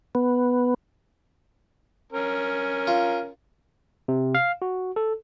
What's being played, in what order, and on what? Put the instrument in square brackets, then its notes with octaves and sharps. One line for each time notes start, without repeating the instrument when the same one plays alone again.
[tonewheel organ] B3
[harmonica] C#4 A#4
[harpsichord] F4
[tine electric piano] C3
F5
F#4
A4